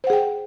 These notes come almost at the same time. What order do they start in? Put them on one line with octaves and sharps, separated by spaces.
C5 F#5 G#4 G5